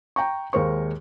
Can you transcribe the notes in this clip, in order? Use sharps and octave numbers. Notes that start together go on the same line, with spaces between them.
G5 A#5 C#6
D#2 G#3 A#4 C5 C#6